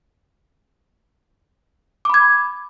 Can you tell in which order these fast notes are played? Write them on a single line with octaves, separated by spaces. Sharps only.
D6 B5 G#6